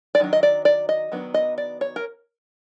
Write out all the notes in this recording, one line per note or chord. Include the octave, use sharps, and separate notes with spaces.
D5
D#3 F#3 D4
D#5
D5
D5
D#5
D#3 F#3 B3 D4
D#5
D5
C#5
A#4